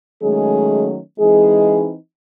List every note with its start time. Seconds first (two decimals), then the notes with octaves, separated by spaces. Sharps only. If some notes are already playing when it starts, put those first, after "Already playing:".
0.22 D#3 F#3 G#3 A3 C#4 G#4
1.18 E3 G#3 C4 D#4 G#4